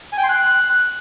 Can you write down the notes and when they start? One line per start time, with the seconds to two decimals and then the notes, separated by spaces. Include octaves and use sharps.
0.13 G#5
0.18 G5
0.24 C6
0.29 F#6